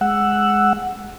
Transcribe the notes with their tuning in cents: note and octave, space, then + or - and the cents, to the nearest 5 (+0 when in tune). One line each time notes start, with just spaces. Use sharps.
G#3 +0 F#5 +0 E6 +5